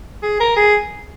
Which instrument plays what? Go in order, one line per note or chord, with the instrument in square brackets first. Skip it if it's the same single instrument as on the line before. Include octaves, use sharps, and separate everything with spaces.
[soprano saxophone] G#4
A#4
G#4